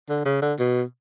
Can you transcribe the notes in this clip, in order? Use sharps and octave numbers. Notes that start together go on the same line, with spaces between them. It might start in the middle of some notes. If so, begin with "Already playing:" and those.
D3
C#3
D3
B2